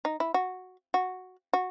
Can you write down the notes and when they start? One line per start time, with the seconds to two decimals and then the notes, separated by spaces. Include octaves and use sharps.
0.05 D#4
0.20 E4
0.34 F#4
0.94 F#4
1.53 F#4